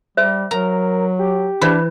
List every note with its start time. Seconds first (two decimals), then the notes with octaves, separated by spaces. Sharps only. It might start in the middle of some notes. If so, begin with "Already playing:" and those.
0.17 G3 C5 E5
0.51 F#3 A#4 A#5
1.19 G4
1.61 E3 D4 C5 B5